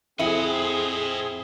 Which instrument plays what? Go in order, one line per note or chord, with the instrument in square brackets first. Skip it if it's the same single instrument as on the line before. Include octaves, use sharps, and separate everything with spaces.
[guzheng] F2 [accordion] C4 G#4 [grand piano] E4 [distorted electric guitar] D#5 F#5